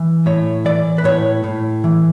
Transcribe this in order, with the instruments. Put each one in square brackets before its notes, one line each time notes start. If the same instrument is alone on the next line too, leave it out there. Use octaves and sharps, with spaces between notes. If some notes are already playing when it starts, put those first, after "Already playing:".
Already playing: [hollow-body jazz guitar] E3
A2 C#5
E3 D5
B4
A2 C#5
A2
E3